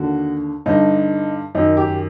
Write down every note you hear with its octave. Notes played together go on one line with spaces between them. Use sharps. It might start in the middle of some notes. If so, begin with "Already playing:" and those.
Already playing: D#2 D3 F#4
G2 D3 D#4
F#2 D#3 D#4
G4